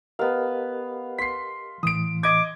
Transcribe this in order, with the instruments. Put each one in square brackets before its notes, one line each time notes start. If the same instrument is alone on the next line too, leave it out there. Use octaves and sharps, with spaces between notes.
[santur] B3 F5 [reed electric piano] G4 A#4 D#5
[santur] C6 [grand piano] B6 C7
[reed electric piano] A2 E3 [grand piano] D#6 D7
[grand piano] D#5 G#6 [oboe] D6